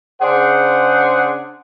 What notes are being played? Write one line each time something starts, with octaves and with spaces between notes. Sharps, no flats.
C#3 D4 G#4 C5 F#5